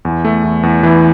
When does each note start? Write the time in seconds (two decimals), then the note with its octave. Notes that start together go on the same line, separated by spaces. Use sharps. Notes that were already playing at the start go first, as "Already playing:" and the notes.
0.05 E2
0.25 A3
0.44 E2
0.63 E2
0.83 E3